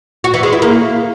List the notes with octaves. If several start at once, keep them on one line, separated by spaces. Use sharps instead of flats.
F#4
E3
G#3
E4
A#3